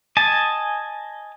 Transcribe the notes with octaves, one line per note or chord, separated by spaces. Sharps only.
D#5 G#5 A5